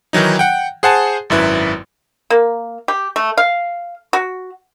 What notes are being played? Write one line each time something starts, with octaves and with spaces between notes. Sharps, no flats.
D#3 E3 F#3 D#4
F#5 G5
G#4 C5 F#5 G#5 A5
G#1 F#2 E4 B4
A#3
G4
A3
F5
F#4